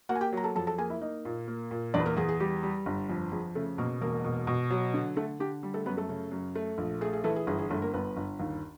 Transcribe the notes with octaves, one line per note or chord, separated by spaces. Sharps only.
A#3 F#4 F#5
G#5
G4 G5
F#3 A#5
A4 A5
F2 A4 A5
A4 A5
A#3 G#4 G#5
E4 E5
A#3 D#4 D#5
A#2
A#3
A#2
E2 D4 D5
B4
A#3 A#4
E2 G#4
G#4
G3 G4
G3
G1
F2
F2 G#4
C#3 A3 A4
B2 A#3 A#4
E1 A#3 A#4
B2
B2
F#3
D3
D3 A3 A4
D3 G4
G3
A3 A4
F#2 B3 B4
A3 A4
C#3
F#2
A3
A#1
A3 G#4
G#4
E3 A3 A4
G#4
G1 G#4
G#4
G1 A3 A4
A#3 A#4
G1 B3 B4
G1
D#2